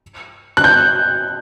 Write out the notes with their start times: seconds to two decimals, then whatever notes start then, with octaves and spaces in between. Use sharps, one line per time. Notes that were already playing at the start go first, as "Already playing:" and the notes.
0.57 F#6
0.64 G6